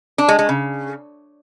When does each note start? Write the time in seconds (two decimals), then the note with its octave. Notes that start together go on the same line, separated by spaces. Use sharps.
0.18 D4
0.28 G#3
0.39 G#3
0.49 C#3